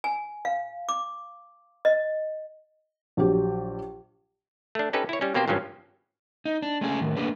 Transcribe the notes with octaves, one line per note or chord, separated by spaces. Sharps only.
G#5
F5
D6
D#5
A#1 F#3 G4
A3 D4
C#4 D#4 G4 A4 B4
E4 C#5
G3 C#4
B2 A#3 C4 G4 C5
G#1 G2 F3 F#3 C#4
D#4
D4
G#3 A3 C#4 G#4
A2 D#3
A3 A#3 D4 G#4 B4